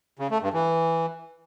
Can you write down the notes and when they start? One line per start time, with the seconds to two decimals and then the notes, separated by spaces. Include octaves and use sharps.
0.19 C#3
0.31 A3
0.42 G2
0.53 E3